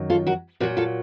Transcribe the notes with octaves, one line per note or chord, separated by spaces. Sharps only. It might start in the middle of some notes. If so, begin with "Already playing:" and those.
Already playing: F#2 D#3 F#3
F4 A4
F#4 A#4
A#2 F#3 F#4 A#4
F4 A4